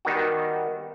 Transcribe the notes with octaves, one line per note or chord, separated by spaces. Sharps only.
D#3 G3 B3 D#4 F#4